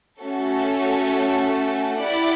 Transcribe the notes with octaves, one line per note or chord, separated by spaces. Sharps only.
A3 C#4 F#4 A4
E4 G4 D5 F#5